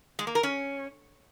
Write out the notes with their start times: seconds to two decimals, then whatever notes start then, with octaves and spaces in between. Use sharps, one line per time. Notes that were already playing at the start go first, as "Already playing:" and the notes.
0.19 G#3
0.27 A#3
0.35 A#4
0.43 C#4